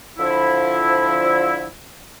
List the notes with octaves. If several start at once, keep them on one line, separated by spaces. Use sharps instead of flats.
D3 F3 E4